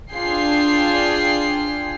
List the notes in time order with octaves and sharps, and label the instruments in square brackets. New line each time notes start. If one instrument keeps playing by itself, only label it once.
[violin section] D4 F4 G#4 G5 C7